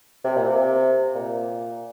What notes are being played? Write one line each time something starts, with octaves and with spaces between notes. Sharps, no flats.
C3
A#2
C3
A#2